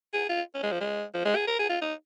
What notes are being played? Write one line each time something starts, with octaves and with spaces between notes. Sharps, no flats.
G#4
F4
C#4
G#3
F3
G#3
F3
G#3
G#4
A#4
G#4
F4
D#4